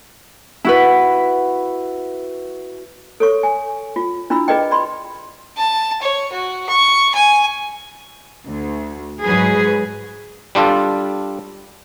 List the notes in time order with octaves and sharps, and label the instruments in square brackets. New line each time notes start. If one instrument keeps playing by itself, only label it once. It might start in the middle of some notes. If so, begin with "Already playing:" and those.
[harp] E4 F#4 B4
[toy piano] A4 C#5 C#6
G#5
F4
D4 E4 F4 B5 E6
G#4 B4 D5 D#5 G5
D5 B5 C6
[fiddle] A5
C#5
F#4
C#6
G#5
[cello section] D2
G#2 F#3 G#4 B4
[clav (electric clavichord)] G3 D4 F4 A4